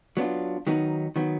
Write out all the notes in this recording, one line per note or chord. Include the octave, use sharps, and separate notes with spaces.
F#3 B3 D4 F4
D#3 F#3 B3 D#4
D#3 F#3 B3